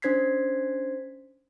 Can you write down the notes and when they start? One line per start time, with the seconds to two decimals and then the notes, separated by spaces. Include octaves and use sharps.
0.02 C#4 D4 C5 G#6 B6 C7